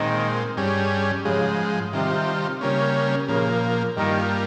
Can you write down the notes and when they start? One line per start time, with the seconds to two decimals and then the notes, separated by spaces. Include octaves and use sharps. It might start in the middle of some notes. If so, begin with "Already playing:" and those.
Already playing: A#2 D#3 G#3 C4
0.57 G2 G3 C#4 G#4
1.25 G#2 C#3 F3 G#3
1.93 C3 D#3 G3 C4 F4
2.61 C#3 G3 A#3 C#4
3.28 A#2 C#3 F3 A#3
3.96 G2 D#3 G3 A#3 F4